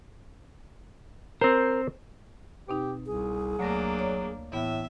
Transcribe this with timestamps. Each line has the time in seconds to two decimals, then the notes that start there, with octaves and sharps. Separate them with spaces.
1.41 C4 A#4 C5
2.68 B2 C4 D#4 G4
3.06 C2 G#4
3.59 D2 F#3 A3 A#3 D4 A#6
3.99 C#5 D5
4.52 A2 E3 B3 E5